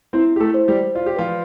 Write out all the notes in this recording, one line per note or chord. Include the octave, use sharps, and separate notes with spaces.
C4 E4 C5
E4 G4
A3 A4
C5
G3 G4
C5
F4 D5
G4
F3 F4 B4